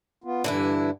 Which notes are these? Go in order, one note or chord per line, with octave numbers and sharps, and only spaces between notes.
B3 F4
G2 D3 E3 D4 E4